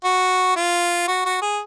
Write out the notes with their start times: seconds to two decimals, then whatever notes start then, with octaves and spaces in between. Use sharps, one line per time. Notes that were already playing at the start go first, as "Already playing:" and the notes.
0.04 F#4
0.56 F4
1.08 F#4
1.25 F#4
1.42 G#4